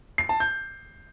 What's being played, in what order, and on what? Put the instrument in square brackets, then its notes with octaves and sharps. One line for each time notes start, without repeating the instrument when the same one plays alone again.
[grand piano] C7
A5
G6